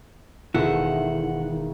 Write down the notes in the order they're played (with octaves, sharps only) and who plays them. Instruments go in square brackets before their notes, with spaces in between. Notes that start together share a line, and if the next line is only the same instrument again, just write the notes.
[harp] E1 [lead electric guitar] D#3 [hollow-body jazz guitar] E4 F#4 A4 [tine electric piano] F#5